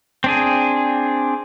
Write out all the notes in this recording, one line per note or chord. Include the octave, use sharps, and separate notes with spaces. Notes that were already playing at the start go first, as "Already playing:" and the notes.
C4 D4 G#4